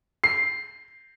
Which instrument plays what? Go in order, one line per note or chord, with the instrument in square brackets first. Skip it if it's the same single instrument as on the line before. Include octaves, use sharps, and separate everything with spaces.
[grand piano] C7